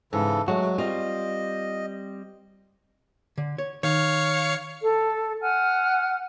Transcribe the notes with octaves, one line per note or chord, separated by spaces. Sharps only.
G#2 C#3 E3 A4
F#3 G#3 A3 F#4
G3 C4 F4 D#5
D3
C#5
D#3 C#5 F5 C#7
A4
F#5 G#5 F6